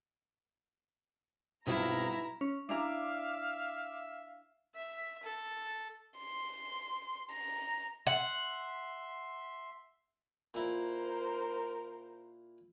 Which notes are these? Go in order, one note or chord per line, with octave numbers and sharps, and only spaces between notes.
B1 G2 B2 C4 E4 F4 A#5
C#4
D4 E4 E5 F5 A#5 D6
E5
A4
C6
A#5
E5 F#5 C6
A#2 E4 A#4 C5